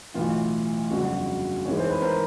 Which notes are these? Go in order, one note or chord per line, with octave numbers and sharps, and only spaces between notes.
B1 A2 E3 F4
G1 F2 C#3 F#3 F#4
G#1 G#2 E3 G#3 C#5
C5
B4
A#4 C5